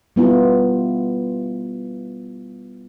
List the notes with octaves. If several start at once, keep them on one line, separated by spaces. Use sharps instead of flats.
G3 B3 E4 F4